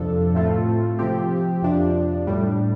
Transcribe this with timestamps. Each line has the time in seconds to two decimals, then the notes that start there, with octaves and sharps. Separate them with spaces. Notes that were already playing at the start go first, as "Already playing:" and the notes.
Already playing: F2 C3 F3 D4 A4
0.35 A2 A3 C4 F4 A4
0.99 C3 F3 C4 G4
1.62 F2 C3 F3 D4
2.27 A2 G3 D4